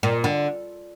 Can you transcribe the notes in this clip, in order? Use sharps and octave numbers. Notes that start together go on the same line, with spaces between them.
A#2
D3